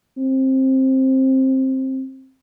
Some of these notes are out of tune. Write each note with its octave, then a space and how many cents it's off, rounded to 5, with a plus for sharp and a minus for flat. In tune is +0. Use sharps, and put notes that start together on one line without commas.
C4 +15